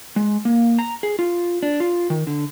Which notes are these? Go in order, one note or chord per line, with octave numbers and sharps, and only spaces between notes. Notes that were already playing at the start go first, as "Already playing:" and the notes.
G#3
A#3
A#5
G#4
F4
D4
F4
D#3
D3